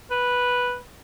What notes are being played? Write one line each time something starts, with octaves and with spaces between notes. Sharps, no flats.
B4